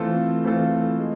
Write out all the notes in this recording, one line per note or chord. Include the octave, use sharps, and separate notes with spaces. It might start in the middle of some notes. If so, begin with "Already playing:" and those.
Already playing: E3 A3 C4 F4 A4
E3 A3 C4 F4 A4
G#3